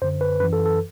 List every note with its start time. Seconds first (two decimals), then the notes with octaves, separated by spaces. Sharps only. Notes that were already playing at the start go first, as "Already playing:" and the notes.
0.02 F#2 D3 C5
0.21 B4
0.40 F#2 E3 B4
0.53 A4
0.66 A4